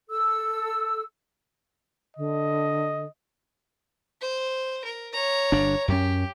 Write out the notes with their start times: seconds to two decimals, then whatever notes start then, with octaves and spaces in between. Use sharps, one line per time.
0.10 A4 E6
2.17 D3 D#5
4.21 C5
4.84 A#4
5.13 C#5 A#5
5.52 G1 D4
5.88 F#2 C#4 G4